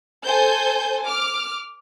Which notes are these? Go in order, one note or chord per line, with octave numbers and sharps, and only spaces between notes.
A4 C5 G#5 G6
D6 F6